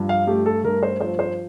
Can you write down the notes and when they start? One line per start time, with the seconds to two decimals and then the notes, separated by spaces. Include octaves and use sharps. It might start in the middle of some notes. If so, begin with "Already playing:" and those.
Already playing: G2 F3
0.09 F5
0.27 A3 G4
0.46 A4
0.64 G2 A#4
0.83 C5
1.00 F3 C5
1.19 C5